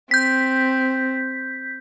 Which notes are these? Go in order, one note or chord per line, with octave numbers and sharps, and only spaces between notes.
C4 G6 B6